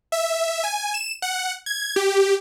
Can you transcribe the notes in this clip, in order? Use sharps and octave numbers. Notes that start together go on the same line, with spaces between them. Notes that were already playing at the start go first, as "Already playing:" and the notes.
E5
G#5
E7
F#5
G#6
G4